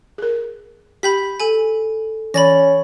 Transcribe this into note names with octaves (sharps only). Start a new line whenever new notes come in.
G#4 A#4
G4 G5 B5 G6 B6
A4 G#5
E3 C#4 B5 A6 A#6